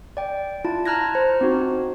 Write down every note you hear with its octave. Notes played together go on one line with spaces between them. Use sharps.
D5 G5
E4 F4 A5
A5 A#5 F6 F#6 G#6 A#6
C5
C4 D#4 F#4